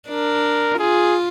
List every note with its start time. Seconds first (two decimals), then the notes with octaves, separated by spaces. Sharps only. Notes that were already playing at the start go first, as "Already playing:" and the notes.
0.08 D4 A#4
0.79 F4 G#4